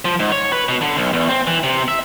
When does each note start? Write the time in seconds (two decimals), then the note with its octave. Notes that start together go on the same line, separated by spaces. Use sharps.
0.05 F3
0.20 G#2
0.32 C#5
0.53 B4
0.69 B2
0.81 D3
0.97 B1
1.13 E2
1.29 C4
1.47 E3
1.63 C3
1.88 E5